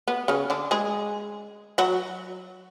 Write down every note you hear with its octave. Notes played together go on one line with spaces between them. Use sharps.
B3
C#3 C#4
D3 D4
G#3 G#4
F#3 F#4